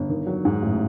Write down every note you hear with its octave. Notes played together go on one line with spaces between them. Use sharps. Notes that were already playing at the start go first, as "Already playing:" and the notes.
Already playing: G1
D#3
F#3
G#2
A1